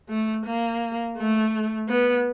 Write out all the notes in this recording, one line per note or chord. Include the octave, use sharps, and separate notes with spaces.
A3
A#3
A3
B3